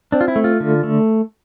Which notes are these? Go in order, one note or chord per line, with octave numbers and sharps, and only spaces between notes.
C4 D4
F4
E4
A3
F4
D3
A3